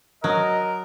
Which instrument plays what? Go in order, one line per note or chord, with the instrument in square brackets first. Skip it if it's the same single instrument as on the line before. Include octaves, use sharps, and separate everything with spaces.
[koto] F#3 [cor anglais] A#4 [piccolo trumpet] D#5